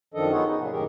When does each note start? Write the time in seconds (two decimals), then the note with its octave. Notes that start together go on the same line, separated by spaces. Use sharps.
0.14 F#2 D#3 F3 D4 A4 D#5
0.32 B3 D#4 F4 G#4 C#5 F#5
0.46 D#4
0.58 A#2 C#3 F#3
0.72 F#2 A2 D#3 G4 G#4 A#4